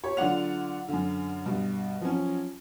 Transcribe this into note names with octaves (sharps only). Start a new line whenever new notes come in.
G4 C#5
D3 F#3 F4 D5 F#5 F7
F#2 D3
G2 B2
F3 F#3 C#4